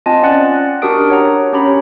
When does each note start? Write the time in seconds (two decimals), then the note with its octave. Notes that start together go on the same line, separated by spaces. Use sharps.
0.06 C4 F4 D#5 G#5 A5
0.23 C#4 D5 F#5 F#6 A6
0.82 D4 F#4 G4 A#4 D#6 D7
1.10 C#5 F#5 A#5
1.53 C#4 G4 C#5 A#5 B5